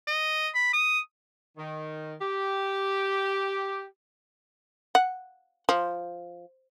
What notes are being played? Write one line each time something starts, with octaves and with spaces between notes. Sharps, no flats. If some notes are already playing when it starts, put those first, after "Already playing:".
D#5
B5
D#6
D#3
G4
F#5
F3